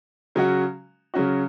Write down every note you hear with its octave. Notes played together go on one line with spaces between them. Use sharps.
C#3 F#3 C#4 F#4
C#3 F#3 C#4 F#4